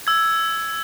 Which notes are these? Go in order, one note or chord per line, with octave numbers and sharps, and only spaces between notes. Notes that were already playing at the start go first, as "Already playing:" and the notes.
E6 G#6